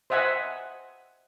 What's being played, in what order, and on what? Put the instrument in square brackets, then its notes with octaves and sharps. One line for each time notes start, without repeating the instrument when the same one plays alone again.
[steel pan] C5 D#5 E5 F#5 G#5